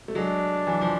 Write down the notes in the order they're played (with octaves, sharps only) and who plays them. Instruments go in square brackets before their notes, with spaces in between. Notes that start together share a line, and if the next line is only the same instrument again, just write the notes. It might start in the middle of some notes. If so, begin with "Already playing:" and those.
[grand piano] A3
[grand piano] F#3 G#3 [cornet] D4
[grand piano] E3 F#3
F3